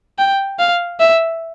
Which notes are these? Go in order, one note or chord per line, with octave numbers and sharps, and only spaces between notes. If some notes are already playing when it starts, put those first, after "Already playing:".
G5
F5
E5